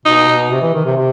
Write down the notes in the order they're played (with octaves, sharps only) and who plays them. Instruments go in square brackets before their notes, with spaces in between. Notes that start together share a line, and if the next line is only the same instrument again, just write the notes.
[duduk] B2 [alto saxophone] D#4
[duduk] B2
C3
E3
D#3
C3
C3